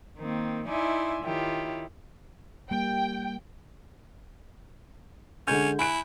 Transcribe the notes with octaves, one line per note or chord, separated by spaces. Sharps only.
D#3 A#3 C4
D#4 E4 D5 E5 G#5 C6
D#3 E4 F4 G4 C#5
G3 A#3 G5
D3 G#3 C#4 G6
E4 G#5 F#6 D7